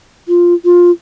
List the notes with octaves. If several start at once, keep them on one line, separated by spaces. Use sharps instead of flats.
F4
F4